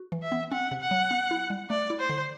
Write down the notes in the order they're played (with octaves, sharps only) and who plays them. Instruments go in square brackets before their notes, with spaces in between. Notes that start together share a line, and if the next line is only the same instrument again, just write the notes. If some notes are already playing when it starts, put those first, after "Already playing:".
Already playing: [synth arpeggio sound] F#4
E3
[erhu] E5
[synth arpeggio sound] B3
[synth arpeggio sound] C4 [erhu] F#5
[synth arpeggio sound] C3
[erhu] F#5
[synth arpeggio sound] F#3
B3
E4
G3
[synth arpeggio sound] A3 [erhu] D5
[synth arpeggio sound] E4
[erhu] C5
[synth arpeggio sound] D3